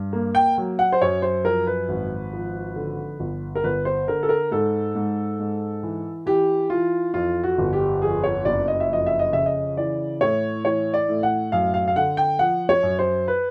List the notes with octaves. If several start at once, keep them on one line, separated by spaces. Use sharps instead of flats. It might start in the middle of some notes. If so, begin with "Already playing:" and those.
Already playing: G2
A#3
G5
F#3
F#5
C5
F#2 C#5
C5
F3 A#4
B4
G#1
F3
D3
G1
A#4
G1 B4
C5
D3 A#4
A4
A#4
G#2 A4
G#2
G#2
E3
E3 G4
E3 F4
F2 F4
F#4
G1
G4
F2 G#4
C#5
F#1 D5
D#5
E5
F2 D#5
E5
D#5
C#3 E5
D#5
E3 D5
A2 C#5
E3 C#5
D5
A2
F#5
F#2 F5
F5
F5
D3 F#5
G5
F3 F#5
C#5
F#2
C5
B4